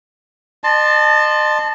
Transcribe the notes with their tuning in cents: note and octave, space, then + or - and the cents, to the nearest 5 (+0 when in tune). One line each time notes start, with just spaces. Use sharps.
D#5 -40 A5 +0 C6 +0